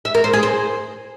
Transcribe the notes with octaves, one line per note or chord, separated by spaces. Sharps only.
E5
A#4
C5
G#4
C5